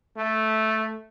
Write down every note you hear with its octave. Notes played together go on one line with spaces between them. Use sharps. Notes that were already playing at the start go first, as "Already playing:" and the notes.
A3